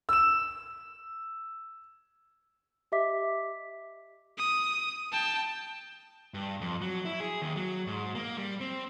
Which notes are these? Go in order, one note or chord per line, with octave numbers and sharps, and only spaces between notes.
E6 E7
G4 D#5 E5 D6 B6
D#6
G5 A5
G2
F2
F#3
E4
G#4
D#2
F#3
G#2
A#3
G3
C4